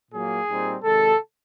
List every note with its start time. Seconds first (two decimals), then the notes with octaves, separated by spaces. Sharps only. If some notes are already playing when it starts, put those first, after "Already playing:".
0.11 A#2 F#3 A#3 G#4
0.47 A#2 G3 C4 D#4
0.83 C3 D#3 G#3 A4